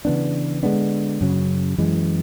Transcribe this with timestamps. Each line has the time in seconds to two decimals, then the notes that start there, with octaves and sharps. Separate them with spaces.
0.05 C#3 E3 B3 D4
0.63 D3 G#3 B3 D4
1.21 F#2 C#3 F#3
1.78 F#2 E3 G#3